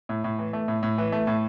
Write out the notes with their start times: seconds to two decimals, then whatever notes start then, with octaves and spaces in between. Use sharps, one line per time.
0.09 A2
0.24 A2
0.39 E3
0.53 A3
0.68 A2
0.83 A2
0.98 E3
1.12 A3
1.27 A2